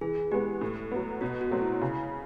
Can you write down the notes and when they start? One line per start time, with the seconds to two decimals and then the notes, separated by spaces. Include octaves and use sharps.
0.01 E3 G#4
0.32 G#3 B3 G4
0.61 A2
0.92 F#3 B3
1.21 B2 F#4
1.41 F#4
1.51 F#3 A3 C4
1.62 E4
1.81 C#3